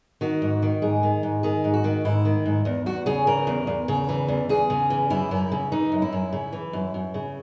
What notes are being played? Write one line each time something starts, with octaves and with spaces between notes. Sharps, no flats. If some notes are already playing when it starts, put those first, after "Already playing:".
D#3 F#4
G#2
D#3
G#2 G#4
D#3
G#2
D#3 G#4
G#2
F#4
D#3
G#2 E4
D#3
G#2
E2
E2 F#4
C#3 G#4
E3 A#4
E2
E2
C#3
E3
E2
E2 G#4
C#3
E3
F#2 E4
F#2
C#3
E3 D#4
F#2
E4
F#2
C#3
E3
F#2
F#2
C#3